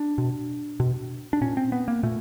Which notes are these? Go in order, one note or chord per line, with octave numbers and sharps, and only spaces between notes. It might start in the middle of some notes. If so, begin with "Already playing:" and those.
Already playing: D4
B2
B2
D4
A#2 C#4
C4
B3
A#3
A#2 A3